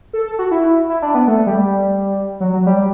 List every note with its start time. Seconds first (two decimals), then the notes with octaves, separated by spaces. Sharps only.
0.13 A4
0.26 A4
0.39 F#4
0.51 E4
0.89 E4
1.02 D4
1.14 B3
1.27 A3
1.47 G3
2.40 F#3
2.53 F#3
2.66 G3